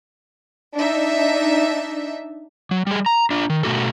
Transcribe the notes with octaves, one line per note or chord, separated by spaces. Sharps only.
D4 D#4 E5
F#3
G3 G#4
A#5
D4 F4
D#3
B2 A3 F#4 A4